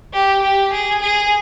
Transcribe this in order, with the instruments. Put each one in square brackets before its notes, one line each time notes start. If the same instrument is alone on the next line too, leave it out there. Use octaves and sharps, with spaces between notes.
[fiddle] G4
G4
G#4
G#4